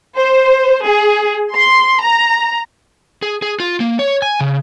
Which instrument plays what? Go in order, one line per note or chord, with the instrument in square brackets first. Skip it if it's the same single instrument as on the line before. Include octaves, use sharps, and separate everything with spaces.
[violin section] C5
G#4
C6
A#5
[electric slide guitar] G#4
G#4
F4
A#3
C#5
G#5
C#3